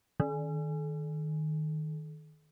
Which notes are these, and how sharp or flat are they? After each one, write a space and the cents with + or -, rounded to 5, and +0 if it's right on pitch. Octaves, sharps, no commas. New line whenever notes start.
D#3 -10